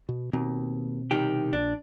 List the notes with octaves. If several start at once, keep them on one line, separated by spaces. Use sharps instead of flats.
B2
D#2 B2 C4
C2 D#3 G4
A#1 D4